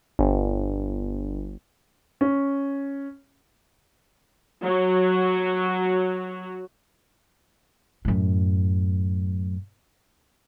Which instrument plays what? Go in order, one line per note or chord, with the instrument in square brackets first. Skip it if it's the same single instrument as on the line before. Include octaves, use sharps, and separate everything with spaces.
[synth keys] G1
[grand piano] C#4
[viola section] F#3 F#4
[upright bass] F#2 A2